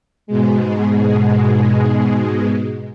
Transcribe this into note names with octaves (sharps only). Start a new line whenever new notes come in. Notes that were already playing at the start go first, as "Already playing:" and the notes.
G#2 B2 G#3